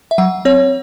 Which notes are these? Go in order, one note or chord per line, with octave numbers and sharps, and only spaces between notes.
E5
F#3 F#5
C4 C#5